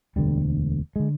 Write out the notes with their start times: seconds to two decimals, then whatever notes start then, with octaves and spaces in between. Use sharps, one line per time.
0.16 E1 D2 D3 G3
0.96 D3 G#3